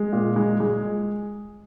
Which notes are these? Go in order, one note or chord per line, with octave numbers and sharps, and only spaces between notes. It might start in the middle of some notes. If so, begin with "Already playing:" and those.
Already playing: G#3
A#2
G#3
G#3